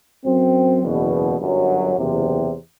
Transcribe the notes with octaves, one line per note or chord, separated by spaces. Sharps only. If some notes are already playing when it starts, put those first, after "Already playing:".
F#2 F#3 C4
F#1 E2 B2
G1 F#2 F#3
F#1 E2 C3